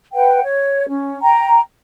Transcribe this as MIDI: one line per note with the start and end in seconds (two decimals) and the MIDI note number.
0.13 0.42 71
0.13 0.42 78
0.13 0.42 79
0.43 0.87 73
0.89 1.18 61
1.22 1.60 79
1.22 1.60 82